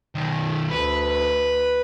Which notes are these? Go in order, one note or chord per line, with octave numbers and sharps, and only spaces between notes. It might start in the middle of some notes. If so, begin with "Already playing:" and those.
B1 D#3
D2 B4